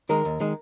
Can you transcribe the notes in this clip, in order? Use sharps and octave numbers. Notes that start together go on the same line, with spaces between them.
D#3 G#3 A#4
D#2
D#3 G#3